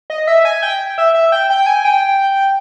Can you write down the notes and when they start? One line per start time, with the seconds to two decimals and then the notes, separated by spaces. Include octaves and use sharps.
0.10 D#5
0.27 E5
0.45 G#5
0.62 G5
0.98 E5
1.14 E5
1.32 G5
1.50 G5
1.66 G#5
1.84 G5